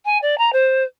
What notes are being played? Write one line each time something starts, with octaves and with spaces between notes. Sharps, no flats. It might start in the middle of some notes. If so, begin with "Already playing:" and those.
G#5
D5
A#5
C5